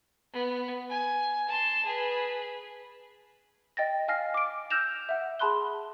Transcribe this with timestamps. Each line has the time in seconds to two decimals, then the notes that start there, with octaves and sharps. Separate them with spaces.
0.33 B3
0.90 G#5
1.48 A5 C6
1.85 G#4 B4
3.77 D#5 G5 A6 A#6
4.08 F5 G#5 F6 A#6 C7
4.34 D6 D7
4.70 E6 F6 G6 A#6 E7 F7
5.09 E5 F#5
5.39 G#4 A5 B5 C6 F#6 G7